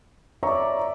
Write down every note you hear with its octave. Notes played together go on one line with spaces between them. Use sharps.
C#5 D5 E5 A#5 C#6